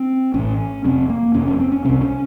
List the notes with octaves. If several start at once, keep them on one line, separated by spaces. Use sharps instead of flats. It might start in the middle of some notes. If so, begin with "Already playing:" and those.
Already playing: C4
A1 A2 C#4
F1 F2 C3 C4
A#3
F1 F2 C3 C#4
C#4
C4
C#4
C2 C3 C4
C#4